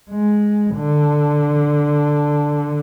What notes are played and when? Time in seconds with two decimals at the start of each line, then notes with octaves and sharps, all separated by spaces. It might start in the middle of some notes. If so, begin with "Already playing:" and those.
0.11 G#3
0.76 D3